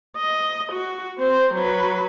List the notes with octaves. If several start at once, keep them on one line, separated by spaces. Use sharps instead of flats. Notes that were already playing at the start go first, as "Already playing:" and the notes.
D#5
F#4
C4 C5
F#3 B4